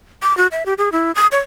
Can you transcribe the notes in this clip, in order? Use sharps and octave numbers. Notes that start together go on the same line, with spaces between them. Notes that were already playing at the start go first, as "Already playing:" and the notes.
D6
F#4
E5
G4
G#4
E4
D#6
C#5